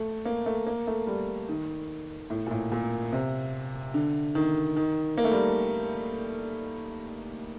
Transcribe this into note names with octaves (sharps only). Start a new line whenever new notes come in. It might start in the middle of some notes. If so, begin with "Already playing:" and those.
Already playing: A3
A#3
A3
A#3
A3
G3
D#3
A2
A#2
A2
A#2
C3
D3
D#3
D#3
A#3
A3
G3